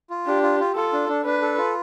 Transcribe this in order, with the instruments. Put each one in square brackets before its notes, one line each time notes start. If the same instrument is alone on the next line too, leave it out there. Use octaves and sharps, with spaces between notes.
[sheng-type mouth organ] F4
[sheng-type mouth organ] D4 [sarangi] G4
[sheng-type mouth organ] F4
F4
[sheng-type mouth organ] F4 [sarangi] A4
[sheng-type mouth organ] D4
D4
[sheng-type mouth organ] D4 [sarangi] B4
[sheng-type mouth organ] A4
F4